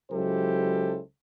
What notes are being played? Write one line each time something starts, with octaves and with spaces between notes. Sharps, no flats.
C#2 F#3 E4 G4 A4 C5